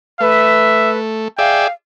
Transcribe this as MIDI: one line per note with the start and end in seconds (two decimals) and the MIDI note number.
0.21 1.28 57
0.21 0.98 71
0.21 0.92 76
1.39 1.67 68
1.39 1.67 74
1.39 1.67 76
1.39 1.72 77
1.39 1.66 79